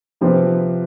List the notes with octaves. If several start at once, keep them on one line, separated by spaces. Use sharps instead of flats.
C3 F3 C4 G4 B4